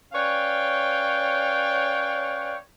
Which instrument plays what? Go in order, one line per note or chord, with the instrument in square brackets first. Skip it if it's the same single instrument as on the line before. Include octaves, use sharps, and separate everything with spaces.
[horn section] C#4 B4 C#5 D5 F5 G5